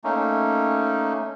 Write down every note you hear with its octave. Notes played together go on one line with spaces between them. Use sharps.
A3 A#3 C#4 D#4